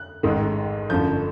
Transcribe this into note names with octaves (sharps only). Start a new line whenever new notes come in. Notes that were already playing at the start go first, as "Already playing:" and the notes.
Already playing: F#6
A1 G#2 D#3 G#3
G1 F#2 D3 F3 A3 G6